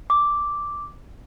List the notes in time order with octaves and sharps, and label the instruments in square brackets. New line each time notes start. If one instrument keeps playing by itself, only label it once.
[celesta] D6